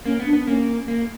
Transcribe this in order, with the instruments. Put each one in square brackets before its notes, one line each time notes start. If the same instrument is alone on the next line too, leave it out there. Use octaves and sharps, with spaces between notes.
[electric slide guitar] A#3 [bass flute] C#4
[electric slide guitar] B3
[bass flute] D4
[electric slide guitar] B3
[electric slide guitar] A#3 [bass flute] C#4
[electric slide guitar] A#3